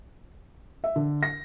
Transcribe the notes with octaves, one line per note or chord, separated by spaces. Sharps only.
E5
D3
A#6